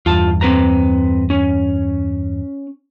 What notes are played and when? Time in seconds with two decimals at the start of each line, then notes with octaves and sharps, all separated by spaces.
0.06 E2 G2 F4 A5
0.41 C4 B4 A#5
1.30 C#4